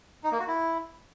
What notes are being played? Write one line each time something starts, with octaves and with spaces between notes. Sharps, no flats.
D#4
A#3
F#4
E4